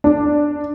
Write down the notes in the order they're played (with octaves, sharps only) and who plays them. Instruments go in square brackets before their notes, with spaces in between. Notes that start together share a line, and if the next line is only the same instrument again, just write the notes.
[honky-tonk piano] D4